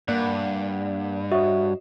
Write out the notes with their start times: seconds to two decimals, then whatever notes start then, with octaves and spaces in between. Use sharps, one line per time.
0.08 G2 A#3 D5 F#5
1.32 F#4 C#5 D#5 E5